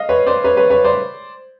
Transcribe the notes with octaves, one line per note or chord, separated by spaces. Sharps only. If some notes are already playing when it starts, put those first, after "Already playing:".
Already playing: D#5 F5
B4 C#5
C5 D5
B4 C#5
B4 C#5
B4 C#5
C5 D5